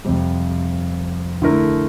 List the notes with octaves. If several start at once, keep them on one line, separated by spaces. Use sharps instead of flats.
F2 C3 G3
D3 A3 E4 A#4